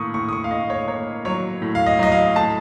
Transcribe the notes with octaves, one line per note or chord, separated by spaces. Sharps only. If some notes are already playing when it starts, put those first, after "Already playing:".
Already playing: A2 A#3 C#6 D#6
A2 C#6
D#6
C#6
F5
A2 D#5
C#5
A#3 C#5
F#3 C#5
A2
F5
D#5
F#3 D#5
F5
A2 A5